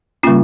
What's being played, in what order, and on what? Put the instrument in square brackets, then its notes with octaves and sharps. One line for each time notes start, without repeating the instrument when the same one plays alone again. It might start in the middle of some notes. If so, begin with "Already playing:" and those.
[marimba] C#3 G3 A#3 C#4 F4